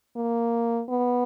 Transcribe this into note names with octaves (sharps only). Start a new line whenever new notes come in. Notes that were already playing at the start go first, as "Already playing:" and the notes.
A#3
B3